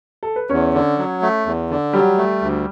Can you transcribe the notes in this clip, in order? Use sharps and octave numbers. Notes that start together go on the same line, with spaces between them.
A4
B4
E2 C#4 C#5
D3
F#3
A3
E2
D3
F#3 G3 G4
A3
D2